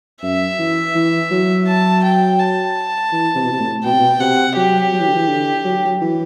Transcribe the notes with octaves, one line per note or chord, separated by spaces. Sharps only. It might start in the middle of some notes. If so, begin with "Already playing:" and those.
F#2 E5
E3
E3
F#3
A5
G5
A5
E3
C3
B2
C3
A2
B2 G5
C3
B2
C3 F#5
F#3 G4
F#3
E3
D3
E3
D3
F#3
F#3
E3